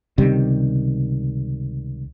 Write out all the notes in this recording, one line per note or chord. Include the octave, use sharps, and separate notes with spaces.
C#2 C3 D#3 G3